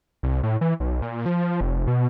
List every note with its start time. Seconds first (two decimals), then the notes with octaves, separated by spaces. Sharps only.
0.23 C2
0.43 A2
0.61 E3
0.80 B1
1.02 A#2
1.26 F3
1.61 F1
1.87 B2